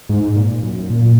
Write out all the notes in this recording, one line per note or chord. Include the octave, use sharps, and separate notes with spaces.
G#2
A#2
F#2
A#2